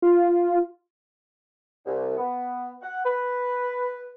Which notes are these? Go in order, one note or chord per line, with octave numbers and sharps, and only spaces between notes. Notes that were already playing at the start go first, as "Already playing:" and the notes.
F4
C2
B3
F#5
B4